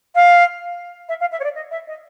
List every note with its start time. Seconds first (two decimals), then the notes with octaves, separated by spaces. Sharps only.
0.15 F5
1.09 E5
1.20 F5
1.32 E5
1.40 C#5
1.44 D5
1.55 D#5
1.71 E5
1.87 D#5